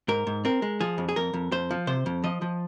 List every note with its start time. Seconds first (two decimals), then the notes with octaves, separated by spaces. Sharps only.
0.08 G#2 A#4
0.27 G#2
0.45 C4 A#4
0.62 G#3
0.81 F3 G#4
0.98 F2
1.09 G#4
1.16 F2 A#4
1.34 F2
1.52 F2 C5
1.71 F3
1.87 C3 C5
2.06 F2
2.24 F3 D#5
2.42 F3